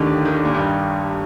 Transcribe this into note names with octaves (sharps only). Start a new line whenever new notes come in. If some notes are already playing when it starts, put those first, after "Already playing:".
Already playing: D#2 D3 D#3 A3 D#4 G4
D#3
D3
A#2
G2